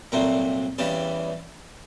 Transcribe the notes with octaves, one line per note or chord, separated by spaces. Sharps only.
C2 A#2 F#3 A3 C4 A#5
E2 C#3 E3 G3 A5